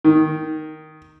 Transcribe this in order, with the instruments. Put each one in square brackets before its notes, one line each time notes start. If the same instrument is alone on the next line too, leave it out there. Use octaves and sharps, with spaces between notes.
[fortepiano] D#3